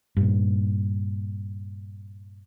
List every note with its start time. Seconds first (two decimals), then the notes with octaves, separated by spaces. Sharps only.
0.17 G2 A#2